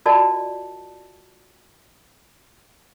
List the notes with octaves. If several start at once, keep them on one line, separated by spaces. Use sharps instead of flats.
F4 F#4 A#4 D5 D#5 A5